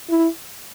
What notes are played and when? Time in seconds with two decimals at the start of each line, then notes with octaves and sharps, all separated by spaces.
0.10 E4